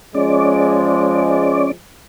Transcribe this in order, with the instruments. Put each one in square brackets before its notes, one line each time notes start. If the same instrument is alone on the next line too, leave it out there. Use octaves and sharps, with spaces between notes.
[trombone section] F3 G#3 [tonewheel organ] C#4 D5